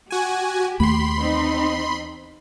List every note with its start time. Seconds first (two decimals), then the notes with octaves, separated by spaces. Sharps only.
0.11 F#4 G4 G#5
0.80 D#2 A3 B5 C6
1.18 E2 C4 D#4